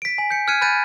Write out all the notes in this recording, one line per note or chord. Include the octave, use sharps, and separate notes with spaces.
B6 D7
G#5
G6 C#7
F6 F#6 G#6 C#7 D#7
G#5 B5 F#6 G6 A6 D#7